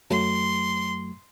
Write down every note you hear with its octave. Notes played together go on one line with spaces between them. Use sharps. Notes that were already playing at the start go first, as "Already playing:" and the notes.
F#2 F#3 A3 C6